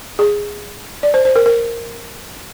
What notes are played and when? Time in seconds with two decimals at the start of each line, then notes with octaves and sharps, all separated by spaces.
0.19 G#4
1.03 D5
1.14 C5
1.25 C5
1.36 A#4
1.46 A#4